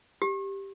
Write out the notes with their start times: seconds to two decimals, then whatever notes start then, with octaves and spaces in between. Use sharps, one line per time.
0.22 G4